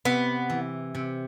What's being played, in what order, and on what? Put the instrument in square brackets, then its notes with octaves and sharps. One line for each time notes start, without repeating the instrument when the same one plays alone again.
[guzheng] C3 [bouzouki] B3
[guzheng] E3
C3